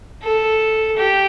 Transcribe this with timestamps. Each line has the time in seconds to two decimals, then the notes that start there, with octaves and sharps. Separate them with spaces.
0.23 A4
0.97 G4